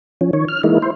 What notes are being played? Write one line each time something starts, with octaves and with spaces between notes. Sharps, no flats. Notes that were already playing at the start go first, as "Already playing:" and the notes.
F3 C#4
D#3 C#5
F6
E3 G#3 A#3 D#4 E4
E4 C5